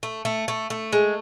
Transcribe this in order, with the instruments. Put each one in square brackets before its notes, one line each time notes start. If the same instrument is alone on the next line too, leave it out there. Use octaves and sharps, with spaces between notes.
[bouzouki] A3
A3
A3
A3
G#3